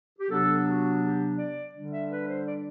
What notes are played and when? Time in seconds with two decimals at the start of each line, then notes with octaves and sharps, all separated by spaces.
0.19 G4
0.29 C3 F#3 B3 D4 A4
0.65 F#4
1.01 G4
1.38 D5
1.73 D3 G3 D4
1.92 E5
2.09 B4
2.27 C5
2.45 D5